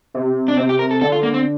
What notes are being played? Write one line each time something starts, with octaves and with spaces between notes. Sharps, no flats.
C3
D4
C3 C4
G4
A#4
A4
D3 A4
F4
A#3
C4